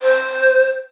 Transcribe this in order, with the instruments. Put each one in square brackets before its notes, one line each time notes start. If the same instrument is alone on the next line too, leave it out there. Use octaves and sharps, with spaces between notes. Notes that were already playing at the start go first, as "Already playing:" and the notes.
[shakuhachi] C5